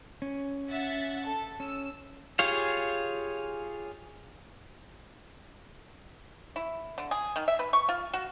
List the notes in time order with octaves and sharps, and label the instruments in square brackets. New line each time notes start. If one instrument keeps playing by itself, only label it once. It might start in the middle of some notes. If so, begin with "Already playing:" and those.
[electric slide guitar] C#4
[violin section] E5 F#5 A6
A4
[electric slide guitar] C#4 [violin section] E6
[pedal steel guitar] F4 G4 G#4 C#5 F5
[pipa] E4
D3
G#4
D#3
E5
B4
C#6
F4
F#4